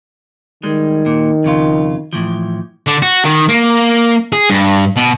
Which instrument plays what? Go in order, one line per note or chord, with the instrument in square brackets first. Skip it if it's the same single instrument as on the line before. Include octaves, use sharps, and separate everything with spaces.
[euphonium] D#3 [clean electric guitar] G3 G#3
[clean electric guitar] A#2
F2 C#3 F4
A2 E3 F3
[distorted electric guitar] D3
F#4
D#3
A#3
G#4
G2
B2